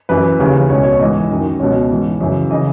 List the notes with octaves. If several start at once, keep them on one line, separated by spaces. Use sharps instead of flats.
F#2 E3 B4
D#2 C#3 E3
C#2 B2 C#5
C#5
G#2 E3 D#5
F#2 D#3
C#2 B2 C#5
G#2 E3
F#2 C#3 E3
C#3 E3 D#5